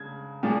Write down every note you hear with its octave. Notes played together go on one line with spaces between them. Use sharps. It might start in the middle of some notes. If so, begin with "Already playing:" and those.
Already playing: C#3 G#3 G#6
A#2 F3 G#3